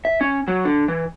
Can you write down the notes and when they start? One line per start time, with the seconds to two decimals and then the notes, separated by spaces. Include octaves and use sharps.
0.05 E5
0.21 C#4
0.48 F#3
0.65 D3
0.88 E3